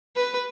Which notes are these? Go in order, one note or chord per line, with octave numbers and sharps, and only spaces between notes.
B4